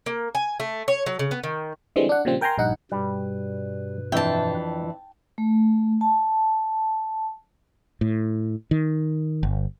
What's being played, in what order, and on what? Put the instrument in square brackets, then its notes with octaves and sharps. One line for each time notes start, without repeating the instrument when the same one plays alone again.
[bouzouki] A#3
G#5
A3
C#5
F#3
C#3
B3
D#3
[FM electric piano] D3 E3 G3 G#3 C4
D4 F#5
A#2 C#3 F3 G3 C4
A#4 G5 G#5 A#5 C6
A#1 G2 D#4 F#5
[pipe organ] G2 B2 B4 [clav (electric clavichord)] G3
[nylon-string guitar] F2 E3 D4 [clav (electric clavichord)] E5 [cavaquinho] G5 A5
[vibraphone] A3
A5
[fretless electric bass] A2
D#3
G1